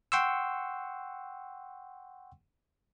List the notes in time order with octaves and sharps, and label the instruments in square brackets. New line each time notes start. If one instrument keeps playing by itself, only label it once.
[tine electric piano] F#5 G5 C6 C#6 E6